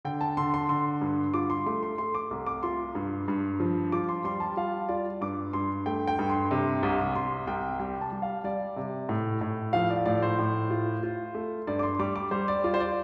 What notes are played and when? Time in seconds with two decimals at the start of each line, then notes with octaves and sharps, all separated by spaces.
0.05 D3 G5
0.21 A5
0.37 D3 C6
0.54 C6
0.69 D3 C6
1.01 G2
1.34 F4 D6
1.50 C6
1.66 A3 C6
1.83 C6
1.98 A3 C6
2.15 D6
2.31 C2
2.46 D6
2.63 F4 C6
2.95 G2
3.28 G2
3.60 F3
3.92 F4 D6
4.09 C6
4.24 G3 C6
4.40 A5
4.57 F4 F5
4.89 F4 D5
5.21 G2 D6
5.53 G2 C6
5.86 A3 G5
6.07 G5
6.19 G2
6.30 C6
6.51 C3
6.83 C2
7.15 C2 C6
7.47 C2 G5
7.80 G3 G5
8.01 A5
8.13 G3
8.22 F5
8.44 G3 D5
8.76 C3
9.09 A2
9.41 A2
9.73 F3 F5
9.90 D5
10.05 A2 D5
10.23 C5
10.39 A2
10.70 F4
11.03 F4
11.35 A3
11.67 G2 D5
11.79 D6
11.83 C6
11.99 G3 D6
12.16 D6
12.31 G3 C5
12.48 D5
12.64 F4 D5
12.74 C5
12.80 D5